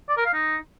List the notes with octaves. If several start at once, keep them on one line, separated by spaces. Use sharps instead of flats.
D5
A#4
F5
D#4